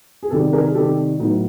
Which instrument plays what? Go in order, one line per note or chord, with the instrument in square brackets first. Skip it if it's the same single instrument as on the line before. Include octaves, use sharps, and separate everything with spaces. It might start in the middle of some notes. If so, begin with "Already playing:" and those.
[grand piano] G#4
C3 D#3 G3 G4 A4
G#4 A#4
C3 D#3 G3 G4 A4
A2 F#3 B3 D#4